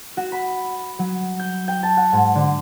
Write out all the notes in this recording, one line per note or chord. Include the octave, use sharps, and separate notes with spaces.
F#4
B5
F#3
G6
G5
A5
F#5
G#2
D3